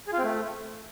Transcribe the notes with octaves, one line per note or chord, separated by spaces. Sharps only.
G#4
F4
C4
A3